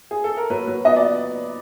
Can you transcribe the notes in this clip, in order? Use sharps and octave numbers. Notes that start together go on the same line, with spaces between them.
G#4
A4
A#4
F#3 B4
F#3
B3 D#5
D5